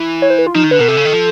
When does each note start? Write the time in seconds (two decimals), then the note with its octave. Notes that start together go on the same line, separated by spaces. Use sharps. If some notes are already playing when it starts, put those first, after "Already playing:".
Already playing: E3
0.22 C#5
0.30 C5
0.38 B4
0.47 F4
0.55 F3 D#4
0.64 D#3
0.71 D3 B4
0.79 B2 A#4
0.88 C3 A4
0.97 C#3
1.05 D#3
1.13 F3